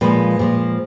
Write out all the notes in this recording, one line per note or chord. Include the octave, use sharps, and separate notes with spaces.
A#2 F3 G#3 B4
A#2 F3 G#3